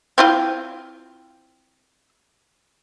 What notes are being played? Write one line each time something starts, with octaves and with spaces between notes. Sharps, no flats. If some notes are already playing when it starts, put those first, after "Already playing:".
C4 E4 F4